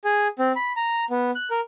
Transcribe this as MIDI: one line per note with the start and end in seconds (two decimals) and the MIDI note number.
0.05 0.28 68
0.39 0.52 60
0.56 0.72 83
0.76 1.05 82
1.10 1.31 59
1.35 1.49 90
1.51 1.60 70